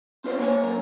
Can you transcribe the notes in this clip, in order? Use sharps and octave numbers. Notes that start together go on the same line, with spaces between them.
C4 F4 B4 C5
A#3 C#5 G#5
F#2 A#4